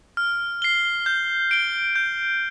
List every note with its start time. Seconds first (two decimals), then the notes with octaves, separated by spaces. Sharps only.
0.17 F6
0.62 C7 G7
1.06 G6
1.51 D7 G7
1.96 G6